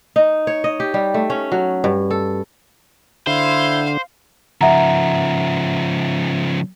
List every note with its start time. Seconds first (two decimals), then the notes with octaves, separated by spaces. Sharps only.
0.16 D#4
0.47 C#5
0.64 D#5
0.80 G4
0.94 G3
1.14 A3
1.30 C#4
1.52 F#3
1.84 G2
2.10 A4
3.27 D3 E4 C5 F5
4.61 C#3 F3 E5 F#5 A#5